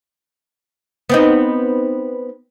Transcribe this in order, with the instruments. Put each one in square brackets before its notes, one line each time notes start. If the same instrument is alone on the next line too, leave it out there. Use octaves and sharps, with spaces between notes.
[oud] B3 C4 D#4